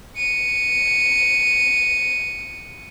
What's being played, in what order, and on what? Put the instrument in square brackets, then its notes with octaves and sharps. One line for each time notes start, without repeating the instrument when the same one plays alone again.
[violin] C#7 D#7